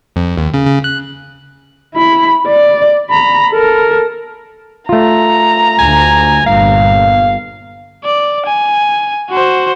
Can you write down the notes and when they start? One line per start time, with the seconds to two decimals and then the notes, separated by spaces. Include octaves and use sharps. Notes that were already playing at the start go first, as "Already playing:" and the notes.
0.16 F2
0.37 D#2
0.54 C#3
0.66 C#3
0.84 F#6
1.95 E4 B5
2.47 D5
3.10 A#5 B5
3.51 A4 A#4
4.89 A3 F4 A#5
5.79 D2 G#5
6.46 G1 G2 A#2 F5
8.05 D5
8.46 G#5
9.31 F#4 C5